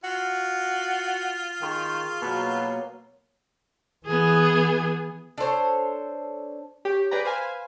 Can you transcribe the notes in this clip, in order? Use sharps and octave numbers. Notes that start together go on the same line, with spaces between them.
F4 F#4
D#3 G#4 C6 C#6
B2 F#3 A#3
E3 B3 G#4
D4 A4 C5 C#5
G4 C#5
G#4 B4 D5 G5 A#5
B4 C5 F5 G#5